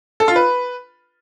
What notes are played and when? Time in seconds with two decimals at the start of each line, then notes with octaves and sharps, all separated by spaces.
0.20 A4
0.28 F4
0.36 B4